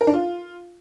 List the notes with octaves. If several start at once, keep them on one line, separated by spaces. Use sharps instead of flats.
A#4
D4
F4